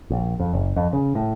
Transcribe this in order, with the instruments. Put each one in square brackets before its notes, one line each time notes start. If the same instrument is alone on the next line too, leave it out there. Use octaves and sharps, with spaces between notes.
[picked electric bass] A#1
F2
F#1
F2
C#3
A2